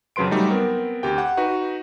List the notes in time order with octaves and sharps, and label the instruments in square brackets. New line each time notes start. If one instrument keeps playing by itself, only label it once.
[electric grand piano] F2 C#3 F#3 B4 C6 D7
F#3 G3 A3 D#4
B3 C4 A#4
D2 G4 G5
F#5
D#4 F#4 B4